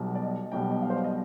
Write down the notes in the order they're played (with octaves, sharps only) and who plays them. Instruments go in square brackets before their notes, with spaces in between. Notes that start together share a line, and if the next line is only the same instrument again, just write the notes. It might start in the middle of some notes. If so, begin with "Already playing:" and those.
Already playing: [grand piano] B1 B2 G3
D5
D#5
B1 B2 G3 G5
D#5
F5
C5
D5
D#5